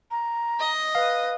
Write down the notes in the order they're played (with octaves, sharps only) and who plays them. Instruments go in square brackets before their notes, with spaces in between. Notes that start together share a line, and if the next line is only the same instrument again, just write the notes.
[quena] A#5
[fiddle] D#5
[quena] B4 [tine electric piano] F5